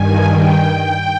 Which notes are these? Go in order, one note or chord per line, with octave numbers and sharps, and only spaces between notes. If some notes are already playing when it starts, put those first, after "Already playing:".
Already playing: G2 D#3 G#5
G5
G5